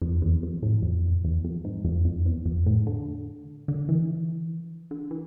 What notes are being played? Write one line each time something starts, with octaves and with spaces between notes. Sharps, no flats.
F2
E2
F2
A2
F2
E2
F2
G#2
F2
F2
E2
F2
A2
D3
D3
E3
D3
E3